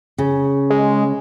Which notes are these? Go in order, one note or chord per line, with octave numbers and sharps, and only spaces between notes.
C#3
G#3